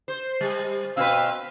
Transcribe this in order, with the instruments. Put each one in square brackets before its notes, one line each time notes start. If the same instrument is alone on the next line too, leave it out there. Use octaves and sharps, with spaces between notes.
[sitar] C5
G3
[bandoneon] B2 F5 E6 [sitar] C4 B4